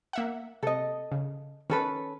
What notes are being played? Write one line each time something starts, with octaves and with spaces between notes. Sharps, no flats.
A#3 E5 F#5
C3 A4 D#5
C#3
D#3 C#4 A4 B4